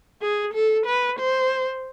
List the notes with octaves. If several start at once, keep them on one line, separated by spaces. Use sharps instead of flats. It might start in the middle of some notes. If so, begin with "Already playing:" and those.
G#4
A4
B4
C5